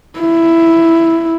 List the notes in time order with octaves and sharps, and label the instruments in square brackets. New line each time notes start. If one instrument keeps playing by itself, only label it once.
[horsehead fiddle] E4